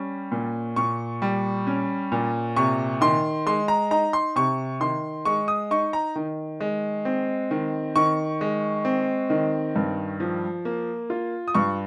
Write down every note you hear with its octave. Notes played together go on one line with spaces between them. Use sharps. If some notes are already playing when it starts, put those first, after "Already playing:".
Already playing: G3 C#4
A#2
A#2 C#6
G3
C#4
A#2
C3 C#6
D#3 C6
G#3 C6
A#5
D#4 A#5
C6
C3 C#6
D#3 C6
G#3 C#6
D#6
D#4 C#6
A#5
D#3
G#3
C4
D#3
D#3 C#6
G#3
C4
D#3
G2
F3
A#3
F4
D#6
G2 C#6